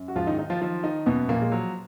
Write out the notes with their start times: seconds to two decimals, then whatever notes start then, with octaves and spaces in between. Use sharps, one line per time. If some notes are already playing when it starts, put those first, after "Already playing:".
Already playing: F#2
0.08 F#4
0.16 G#2 F3 F4
0.27 D#3 D#4
0.38 D#3 D#4
0.50 F3 F4
0.62 D#3 F3 F4
0.84 D#3 D#4
1.06 F#2 B2 B3
1.29 A#2 F3 A#3
1.42 G#3
1.52 F3 F#3